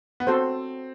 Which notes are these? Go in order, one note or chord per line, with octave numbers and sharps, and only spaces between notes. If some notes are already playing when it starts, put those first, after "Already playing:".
B3
C4 F#4 A4 C5